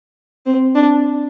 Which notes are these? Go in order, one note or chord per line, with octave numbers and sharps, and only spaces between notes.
C4
D4